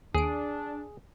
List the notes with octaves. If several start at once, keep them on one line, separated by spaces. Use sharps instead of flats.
D#2 D4 G#4 D7